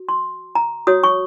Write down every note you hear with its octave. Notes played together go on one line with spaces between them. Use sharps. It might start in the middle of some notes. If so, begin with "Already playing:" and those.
Already playing: F#4
C6
A#5
F#4 C#5 D#6
C#6